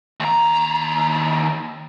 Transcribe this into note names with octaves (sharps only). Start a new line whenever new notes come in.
D#2 A#5